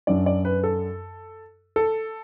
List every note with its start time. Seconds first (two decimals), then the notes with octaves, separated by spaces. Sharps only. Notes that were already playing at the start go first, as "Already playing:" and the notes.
0.07 F#2 F#3 D4 D5
0.26 D5
0.45 B4
0.64 A4
1.76 A4